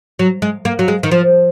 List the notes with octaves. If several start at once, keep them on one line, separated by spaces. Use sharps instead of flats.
F#3
G#3
A#3
F#3
G#3
D#3
F3